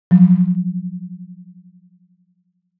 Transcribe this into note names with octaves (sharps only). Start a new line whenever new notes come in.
F3 F#3